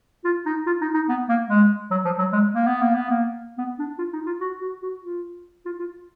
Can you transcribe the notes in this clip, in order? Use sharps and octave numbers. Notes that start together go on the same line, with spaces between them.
F4
D#4
F4
D#4
D#4
B3
A#3
G#3
F#3
F3
F#3
G#3
A#3
B3
A#3
B3
A#3
B3
D4
F4
D#4
F4
F#4
F#4
F#4
F4
F4
F4